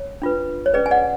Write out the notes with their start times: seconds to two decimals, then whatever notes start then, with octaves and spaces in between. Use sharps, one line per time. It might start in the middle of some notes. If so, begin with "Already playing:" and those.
Already playing: C#5
0.22 D4 F4 B4
0.66 C#5
0.73 C#4 G#4 B4 D5
0.86 G#5
0.91 D5 F#5